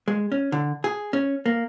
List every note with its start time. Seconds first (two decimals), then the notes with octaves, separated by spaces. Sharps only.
0.08 G#3
0.32 C#4
0.52 D3
0.84 G#4
1.13 C#4
1.46 A#3